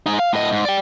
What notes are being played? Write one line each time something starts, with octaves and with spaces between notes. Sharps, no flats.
G#3 D#4
F5
A2 D#5
G#2
D5 G5